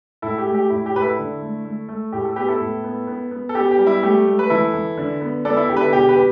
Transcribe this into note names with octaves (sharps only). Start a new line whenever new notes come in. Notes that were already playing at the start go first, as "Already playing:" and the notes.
A2 E4 A4
G4
A3
G4
A2 E4
G4
A2 B4
E4 A4
D3
A3
A3
A3
A2 G4
A4
B3 G4 B4
E4 A4
A2
B3
B3
B3
A4
B3 G4
G4
G3
E4
A3 G4
A3
B4
E3 E4 A4
E3
D3
B3
B3 A4 D5
E4 A4
D3 G4
B4
E4 A4
B2 G4
G4 B4
B2